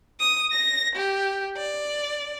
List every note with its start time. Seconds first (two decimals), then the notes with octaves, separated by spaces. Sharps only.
0.20 D#6
0.52 A#6
0.96 G4
1.57 D5